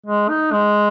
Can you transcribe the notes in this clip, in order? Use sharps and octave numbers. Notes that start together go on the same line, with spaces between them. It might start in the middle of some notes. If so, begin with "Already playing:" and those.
G#3
D#4
G#3